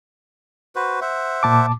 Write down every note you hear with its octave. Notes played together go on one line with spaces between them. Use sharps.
F#4 B4 C5
C5 E5 F#5
A#2 A5 D6